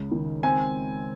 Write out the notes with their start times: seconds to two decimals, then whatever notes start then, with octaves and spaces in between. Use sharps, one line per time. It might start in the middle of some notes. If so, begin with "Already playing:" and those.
Already playing: C#2 C#3
0.12 D#3
0.43 C4 G#5